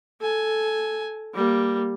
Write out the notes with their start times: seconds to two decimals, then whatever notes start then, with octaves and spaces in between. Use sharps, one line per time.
0.21 A4 G#5
1.34 G3 A#3